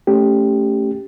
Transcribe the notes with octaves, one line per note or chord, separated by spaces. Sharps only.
A3 C#4 G4